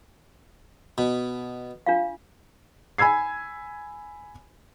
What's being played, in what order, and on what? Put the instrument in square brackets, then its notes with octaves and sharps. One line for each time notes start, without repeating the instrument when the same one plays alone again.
[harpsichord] B2
[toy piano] D4 F4 F5
[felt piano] G#5 B5 E6 G#6 C7